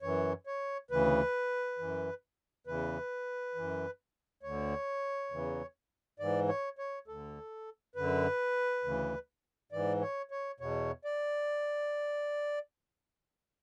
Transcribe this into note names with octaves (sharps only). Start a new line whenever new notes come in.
F#2 E3 C#5
C#5
D2 C#3 E3 B4
F#2 E3
E2 C#3 E3 B4
F#2 E3
D2 D3 C#5
E2 C#3 E3
G#2 E3 D5
C#5
C#5
D2 D3 A4
F#2 D3 B4
D2 C#3 E3
G#2 E3 D5
C#5
C#5
E2 B2 C#5
D5